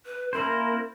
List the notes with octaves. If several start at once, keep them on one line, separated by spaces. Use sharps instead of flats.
B4
A#3 C#4 E4 A#4 C5